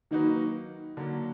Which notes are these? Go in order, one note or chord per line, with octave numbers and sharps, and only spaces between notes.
D#3 F#3 A#3 D#4 F#4 B4
D3 F#3 A#3